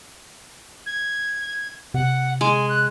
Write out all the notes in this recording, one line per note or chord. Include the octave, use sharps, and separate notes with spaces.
G#6
C3 F#5
G#3 G#5
F#6